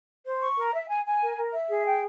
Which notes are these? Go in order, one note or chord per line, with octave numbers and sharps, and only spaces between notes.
C5
C#6
A#4
E5
G#5
G#5
A#4
A#4
E5
G#4
G5